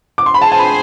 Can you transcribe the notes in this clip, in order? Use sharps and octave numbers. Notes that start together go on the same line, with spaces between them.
D6
C6
B5
G#4 C5 G#5 A5
A5
B5